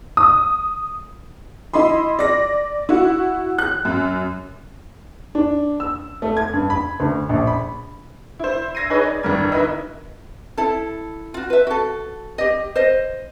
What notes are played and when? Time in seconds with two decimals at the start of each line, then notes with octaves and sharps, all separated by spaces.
0.17 D#6
1.73 E4 D#5 B5 C6
2.19 D5 A#6
2.89 E4 F#4
3.58 F#6
3.85 F#2
5.35 D4
5.80 E6
6.22 A3
6.37 G#6
6.53 G2
6.70 B5
7.00 D2
7.29 A#1
7.47 B5
8.39 E4 C5
8.75 E6 G#6 A#6 C7 D#7
8.90 D#4 G#4 B4 C#5 D#5
9.05 D5
9.23 D2 G2 E3 G3 A#4 G#6
9.52 D#4 E4 A#4 B4 D#5 E5
10.57 E4 A4
11.34 F4 F#4
11.50 B4 E5
11.67 F#4 A4
12.38 G4 D#5
12.76 C5 D#5